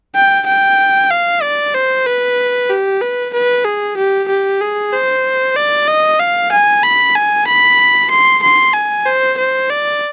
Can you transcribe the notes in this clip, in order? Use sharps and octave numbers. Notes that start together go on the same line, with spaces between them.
G5
G5
F5
D5
C5
B4
G4
B4
B4
G#4
G4
G4
G#4
C5
D5
D#5
F5
G#5
B5
G#5
B5
C6
C6
G#5
C5
C5
D5